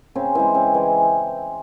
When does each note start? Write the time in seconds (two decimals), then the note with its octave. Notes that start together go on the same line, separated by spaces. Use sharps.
0.15 C#3 C4
0.35 E3 G#3 C4
0.54 C#3 C4
0.74 E3 G#3